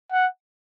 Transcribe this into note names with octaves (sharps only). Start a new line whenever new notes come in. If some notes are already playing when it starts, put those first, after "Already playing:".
F#5